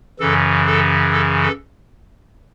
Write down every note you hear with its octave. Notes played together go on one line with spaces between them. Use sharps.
F#2 C#3 E3 A4
A4
A4
A4